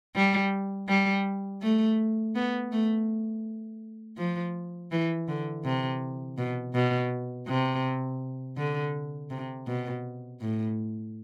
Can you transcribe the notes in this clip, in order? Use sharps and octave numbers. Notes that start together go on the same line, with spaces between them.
G3
G3
A3
B3
A3
F3
E3
D3
C3
B2
B2
C3
D3
C3
B2
A2